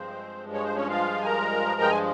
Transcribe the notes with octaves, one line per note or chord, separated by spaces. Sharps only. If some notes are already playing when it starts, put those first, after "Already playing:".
Already playing: G2 F3 G#3 C4 C5
C#5
C5
C#4 C#5
F4 F5
G#5
A#4 A#5
G5
G#5